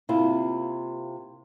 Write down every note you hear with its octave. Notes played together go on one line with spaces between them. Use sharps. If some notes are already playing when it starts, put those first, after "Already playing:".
C3 A#3 E4 F4